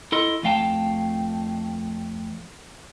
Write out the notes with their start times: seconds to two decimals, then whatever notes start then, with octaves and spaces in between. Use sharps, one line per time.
0.12 E4 A4 D#5 C6
0.43 F2 A3 F5 G5 A5